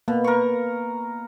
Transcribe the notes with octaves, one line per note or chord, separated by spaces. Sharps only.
B2 A#3
A#4 C#6